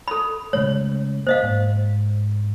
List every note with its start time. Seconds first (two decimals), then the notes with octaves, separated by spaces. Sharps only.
0.08 A4 B5
0.53 C#3 G#3 A3 C#5
1.27 A#3 C5 D#5 F5
1.43 G#2